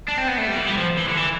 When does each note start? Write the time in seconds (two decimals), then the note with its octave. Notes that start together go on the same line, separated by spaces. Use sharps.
0.08 D4
0.17 C4
0.28 B3
0.38 A3
0.48 G3
0.58 E3
0.68 G3
0.78 F3
0.98 E3
1.08 D3
1.17 E3